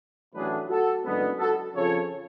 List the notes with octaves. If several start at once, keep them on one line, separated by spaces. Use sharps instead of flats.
A1 A2 F#3 A3 D4 G#4 B4
F#4 A4
F#1 F#2 D3 G#3 B3
F#4 A4
F2 C#3 F3 A4 C#5